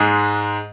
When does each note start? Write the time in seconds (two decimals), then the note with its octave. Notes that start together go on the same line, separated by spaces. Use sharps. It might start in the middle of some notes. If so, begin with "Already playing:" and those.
Already playing: G#2 G#3